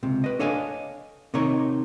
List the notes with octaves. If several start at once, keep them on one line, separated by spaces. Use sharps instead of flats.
C#2 C3
B4 D#5
D4 A4 C#5 D#5 F5 G#5
C3 D#3 D#4 C#5 A#5